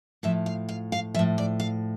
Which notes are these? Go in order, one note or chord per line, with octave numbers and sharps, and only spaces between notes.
A2 F3 E5
F5
F5
F5
A2 F3 E5
D5
F5